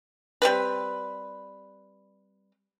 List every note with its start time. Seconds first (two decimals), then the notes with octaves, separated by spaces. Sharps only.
0.42 G3 C4 B4